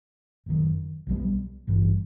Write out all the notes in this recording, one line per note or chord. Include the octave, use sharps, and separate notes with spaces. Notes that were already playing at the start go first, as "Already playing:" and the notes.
F#1 F#2 D#3
B1 A#2 G3 B3
G#1 G2 E3